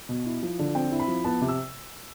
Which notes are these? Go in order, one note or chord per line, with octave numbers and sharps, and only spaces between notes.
B2
E4
F3
D3
C4 G5
E4
B5
F3
B3 A5
C3
E6